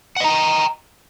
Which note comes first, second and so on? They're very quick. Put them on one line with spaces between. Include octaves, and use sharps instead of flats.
F#5 D#5 A#5 G5